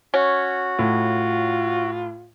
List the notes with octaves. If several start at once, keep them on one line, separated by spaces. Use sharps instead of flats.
C#4 F#4
A2 F4